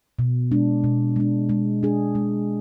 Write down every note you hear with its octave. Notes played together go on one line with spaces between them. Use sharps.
B2
G#3 D4
B2
G#3 D4
G#3
D4 G#4
G#3